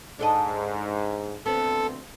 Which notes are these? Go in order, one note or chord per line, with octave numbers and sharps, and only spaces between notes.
G#2 D4 A4 D#5
D2 B3 C4 A4